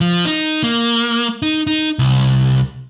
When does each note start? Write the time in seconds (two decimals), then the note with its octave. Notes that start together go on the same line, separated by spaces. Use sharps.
0.01 F3
0.25 D#4
0.64 A#3
1.42 D#4
1.67 D#4
1.99 C2